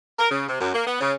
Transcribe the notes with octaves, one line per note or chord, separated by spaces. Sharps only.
A#4
C#3
C3
F#2
A#3
B3
C#3